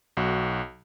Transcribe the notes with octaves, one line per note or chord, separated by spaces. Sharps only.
B1 F#4